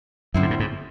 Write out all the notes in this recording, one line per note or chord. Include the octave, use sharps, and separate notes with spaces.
F#2 D3 G3 C4 E4
G#2
A2
G#2